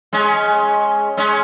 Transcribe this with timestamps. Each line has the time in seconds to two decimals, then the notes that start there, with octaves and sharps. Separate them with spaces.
0.13 G#3 C#4
1.17 G#3 C#4